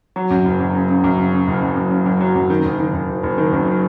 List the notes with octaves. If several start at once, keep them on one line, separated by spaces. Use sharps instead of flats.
F#3
F#2
F#1
F#2
C#3
C#3
F#2
C#3
C#3
F#1
F#2
F#2
C#3
F#2
F#3
F#2
D#3
F#1
D#3
F#1
F#1
F#1
D#3
F#2